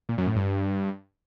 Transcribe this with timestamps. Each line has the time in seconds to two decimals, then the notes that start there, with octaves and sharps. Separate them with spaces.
0.09 A#2
0.18 F#2
0.27 A2
0.36 G2